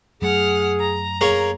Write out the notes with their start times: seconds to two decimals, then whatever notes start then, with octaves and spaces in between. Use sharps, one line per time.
0.22 F#2 F#3 A3 G#4 F#5 F6
0.81 A#5
1.21 A#3 G#4 C#5